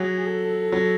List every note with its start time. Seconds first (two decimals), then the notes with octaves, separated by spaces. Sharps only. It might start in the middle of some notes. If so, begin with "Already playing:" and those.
Already playing: F#3 G#4
0.25 A4
0.72 F#3